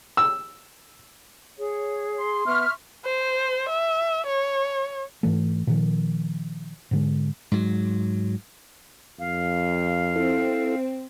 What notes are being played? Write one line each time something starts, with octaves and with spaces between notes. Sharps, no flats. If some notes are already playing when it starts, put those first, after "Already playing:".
E6
G#4 C#5
C6
B3 E5 C#6 F6
C5
E5
C#5
G#2 E3 A3
A#2 D#3 F3
G#2 D3 G#3
G#2 F#3
F2 F5
C4 E4 A4